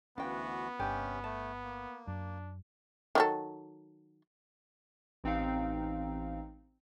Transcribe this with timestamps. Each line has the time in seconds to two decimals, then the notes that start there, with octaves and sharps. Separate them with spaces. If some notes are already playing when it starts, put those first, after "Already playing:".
0.18 D2 E3 B3 C#4 F4 F#4 G5
0.79 G1 C3 C#4 D4 G4 G#5
1.24 A3 A5
1.64 A#3
2.07 F#2 D4
3.15 D#3 F#3 A4
5.24 A1 C4 D#4 F5